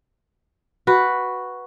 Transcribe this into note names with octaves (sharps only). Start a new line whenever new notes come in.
F#4 B4